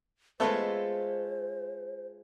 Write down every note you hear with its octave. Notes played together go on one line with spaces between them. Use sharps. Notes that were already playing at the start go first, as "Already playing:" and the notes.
G#3 A3 B3 F4 A4 C5 E5